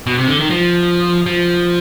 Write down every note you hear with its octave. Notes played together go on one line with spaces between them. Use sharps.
B2
C3
D3
D#3
F3
F3